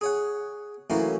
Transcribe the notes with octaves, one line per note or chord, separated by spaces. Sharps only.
G#4 C#5 F#5
A2 E3 F#3 A#3 C#4